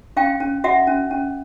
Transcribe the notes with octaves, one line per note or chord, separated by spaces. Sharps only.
C#4 F5 G5
C#4
F#4 E5 F#5
C#4
C#4